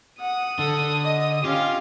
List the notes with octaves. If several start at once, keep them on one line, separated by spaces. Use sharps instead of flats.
F#5 D#6
D3 A4
D#5
C#4 F4 G4 F5